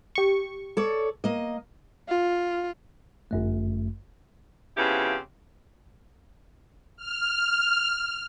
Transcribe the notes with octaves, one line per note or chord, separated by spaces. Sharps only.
G4 C#6
A4 C#5 D5
A#3 D#5
F4
G1 F#2 A3
C#3 F3 B3 C4 E4 G4
F6